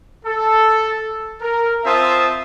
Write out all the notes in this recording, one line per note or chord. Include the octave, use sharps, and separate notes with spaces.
A4
A#4
C4 F4 C5 E5 A5 D#6